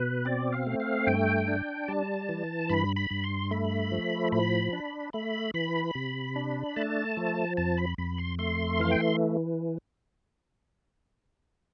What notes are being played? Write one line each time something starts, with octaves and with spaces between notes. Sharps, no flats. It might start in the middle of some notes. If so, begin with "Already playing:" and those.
Already playing: B2 B4
C4 D5
F5
A3
F5
G2 G5
D4
G3 A5
E3
G2 B5
B5
G2
C6
A3 B5
F3
A2 B5
D4
A3 B5
E3 B5
C3
D4
A3 A5
F3
F2 A5
B5
F2 B5
C6
A3 C6
E3 F5
G5